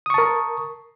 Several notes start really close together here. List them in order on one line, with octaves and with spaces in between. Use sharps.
D#6 C#6 A5 A#4